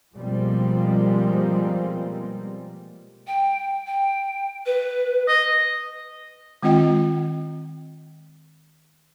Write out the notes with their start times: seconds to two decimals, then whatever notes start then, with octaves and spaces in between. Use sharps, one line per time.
0.16 B2 F3 G3 G#3 A#3 C4
3.27 G5
3.86 G5
4.66 B4
5.28 D#5
6.63 D#3 G#3 C4 F4 D#5 G5